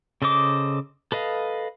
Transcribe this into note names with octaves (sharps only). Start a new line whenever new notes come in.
C#3 A4 C5 D#5 D6
A4 B4 D#5 F5